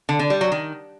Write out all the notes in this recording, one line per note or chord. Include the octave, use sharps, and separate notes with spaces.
D3
D3
G3
F#3
D#3